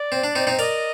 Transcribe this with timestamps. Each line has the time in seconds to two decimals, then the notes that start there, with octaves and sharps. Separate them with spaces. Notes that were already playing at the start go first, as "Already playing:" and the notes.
Already playing: D5
0.12 C4
0.24 D4
0.35 C4 D#4
0.47 C4 D#4
0.59 A#4 D5 D#5